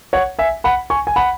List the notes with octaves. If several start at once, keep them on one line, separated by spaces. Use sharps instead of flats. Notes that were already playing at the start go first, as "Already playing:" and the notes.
C#5 F#5
E5 G#5
F#5 B5
G#5 C#6
G#5
F#5 B5